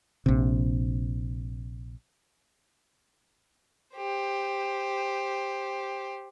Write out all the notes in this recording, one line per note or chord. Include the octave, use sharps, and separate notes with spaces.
A#1 C3
G4 C5